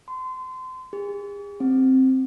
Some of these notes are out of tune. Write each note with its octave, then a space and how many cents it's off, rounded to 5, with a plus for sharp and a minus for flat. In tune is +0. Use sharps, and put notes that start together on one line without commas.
C6 -30
G#4 -40
C4 +0